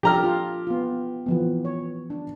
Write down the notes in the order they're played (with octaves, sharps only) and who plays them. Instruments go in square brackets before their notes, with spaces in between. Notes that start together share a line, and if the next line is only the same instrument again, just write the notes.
[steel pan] F3 D4 A4 [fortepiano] G4 A#5 F6
[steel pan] F4
B3 F4
E3 F3 B3
C#5
D4